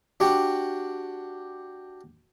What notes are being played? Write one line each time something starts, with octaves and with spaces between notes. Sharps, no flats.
D4 F#4 G4 F#5 G5